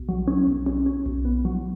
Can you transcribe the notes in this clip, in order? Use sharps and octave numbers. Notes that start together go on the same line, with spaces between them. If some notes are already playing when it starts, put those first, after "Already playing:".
Already playing: B1
F#3
C#4
B1
C#4
C#4
B1
B3
F#3